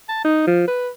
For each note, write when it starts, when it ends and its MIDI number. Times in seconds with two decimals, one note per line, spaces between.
0.09 0.22 81
0.24 0.45 63
0.47 0.65 53
0.68 0.90 71